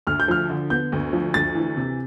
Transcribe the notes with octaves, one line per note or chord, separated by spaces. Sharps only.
D2 F6
G6
F3 F6
D3
B3 G6
D2
F3
D2 A6
E3
C3